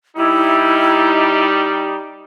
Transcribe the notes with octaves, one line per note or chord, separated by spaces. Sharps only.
G3 D#4 E4